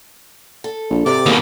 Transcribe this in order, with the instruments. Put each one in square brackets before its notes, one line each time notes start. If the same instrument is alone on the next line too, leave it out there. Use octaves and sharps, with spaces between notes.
[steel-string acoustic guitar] A4
[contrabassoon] A#1
[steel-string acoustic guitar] G#2 G4 [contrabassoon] C3 [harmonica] D5 D6
[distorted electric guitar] D#2 B2 [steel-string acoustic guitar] A#3 G#4